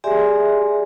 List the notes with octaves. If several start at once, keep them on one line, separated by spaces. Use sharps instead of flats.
G4 G#4 D5 E5 G#5 C6